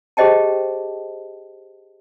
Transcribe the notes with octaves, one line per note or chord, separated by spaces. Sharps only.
G4 G#4 C5 D#5 G5 A5